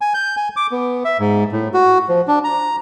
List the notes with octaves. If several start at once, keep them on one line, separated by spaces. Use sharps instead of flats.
G#5
G6
G#5
D6
B3
E5
G#2
A2
F#4
F3
D4
A#5